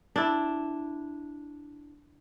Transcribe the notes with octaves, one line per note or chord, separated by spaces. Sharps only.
D4 E4